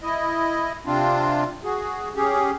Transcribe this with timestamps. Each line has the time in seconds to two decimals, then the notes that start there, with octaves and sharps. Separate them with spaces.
0.03 E4 D#5
0.86 C3 C4 D4 F4
1.64 F#4 G#4
2.15 C#4 G4 G#4